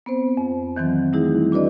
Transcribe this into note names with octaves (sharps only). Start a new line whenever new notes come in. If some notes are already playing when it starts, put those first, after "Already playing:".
B3 C4 C5
F2
D#3 E3 F#3 C4
E3 G3 A3 D#4 E4 G#4
D4 F#4 B4 D5 D#5